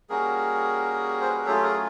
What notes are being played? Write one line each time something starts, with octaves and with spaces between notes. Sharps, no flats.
G3 A#3 C#4 F#4 G#4 A#4
C5
B4
A#4
F#3 A3 C#4 F4 G4 A4
G#4 A#4